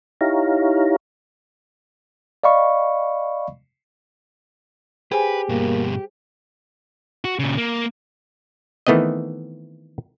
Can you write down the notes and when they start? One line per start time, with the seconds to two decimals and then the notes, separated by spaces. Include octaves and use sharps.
0.21 D#4 E4 G4 C#5 F5 A#5
2.44 D5 D#5 F5 B5 C#6
5.12 G4 G#4 B4 C5 G#5
5.49 G2 B2 A#3
7.25 F#4
7.39 A#2 C#3
7.58 A#3
8.87 D#3 E3 A3 B3 C4 D#5